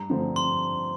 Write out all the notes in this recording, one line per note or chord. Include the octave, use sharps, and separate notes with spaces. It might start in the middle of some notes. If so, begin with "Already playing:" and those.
Already playing: G2 A#5
D3 F3 A3 C4
C6